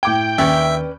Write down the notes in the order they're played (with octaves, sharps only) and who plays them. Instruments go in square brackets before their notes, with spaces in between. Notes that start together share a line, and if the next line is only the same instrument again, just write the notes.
[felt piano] A2 D6 G#6 [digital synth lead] G5
[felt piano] D#2 [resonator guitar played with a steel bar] C#4 B4 D5 [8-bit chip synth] E5